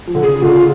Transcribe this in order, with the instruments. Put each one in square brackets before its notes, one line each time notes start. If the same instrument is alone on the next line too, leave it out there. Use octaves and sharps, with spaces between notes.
[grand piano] F3
D3
[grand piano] C#3 [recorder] G#4
[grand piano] D3 [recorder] F4